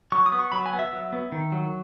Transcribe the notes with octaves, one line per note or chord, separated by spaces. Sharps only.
F#3 C#6
D#6
B3
C#6
F#3 B5
G#5
B3
E5
F#3
B3
D#3
F#3